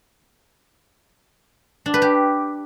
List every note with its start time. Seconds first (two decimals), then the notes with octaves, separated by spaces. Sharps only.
1.86 D4
1.94 B4
2.02 G4